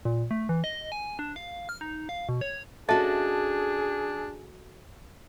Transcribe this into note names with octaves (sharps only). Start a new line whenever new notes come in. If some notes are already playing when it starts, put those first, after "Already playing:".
A#2
A3
E3
D#5
G#5
D4
F5
F6
D#4
F5
B2
C#5
C#4 D4 F#4 G#4 A4 D#5 E5 A5